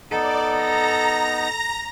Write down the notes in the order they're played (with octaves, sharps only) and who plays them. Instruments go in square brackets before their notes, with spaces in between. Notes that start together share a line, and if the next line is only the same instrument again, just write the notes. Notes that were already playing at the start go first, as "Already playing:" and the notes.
[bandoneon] B3 D#4 [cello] A4 [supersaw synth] D5
[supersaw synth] A#5 A#6